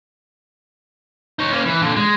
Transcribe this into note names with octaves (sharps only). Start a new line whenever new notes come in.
D#4 C#5
A#3 C#4
E3
A#2 D3
G#3